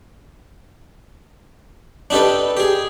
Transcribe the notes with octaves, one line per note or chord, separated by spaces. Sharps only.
D4 D#4 G4 A4 B4
G4 G#4